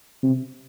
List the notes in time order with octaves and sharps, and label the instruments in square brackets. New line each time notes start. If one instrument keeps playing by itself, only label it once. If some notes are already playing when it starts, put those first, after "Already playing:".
[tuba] C3